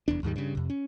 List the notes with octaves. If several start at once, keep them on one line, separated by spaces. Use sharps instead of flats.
F1 E2 D4
D#2 G#2 D#3 G3
G2 C#3
F2 C3
C#4